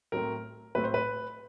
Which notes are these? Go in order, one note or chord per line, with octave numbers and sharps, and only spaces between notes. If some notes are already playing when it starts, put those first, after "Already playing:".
A2 F#3 A3 C4 A#4
A2 F#3 A3 C4 B4
C5
B4